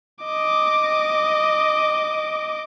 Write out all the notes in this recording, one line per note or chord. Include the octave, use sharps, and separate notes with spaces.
D#5 D6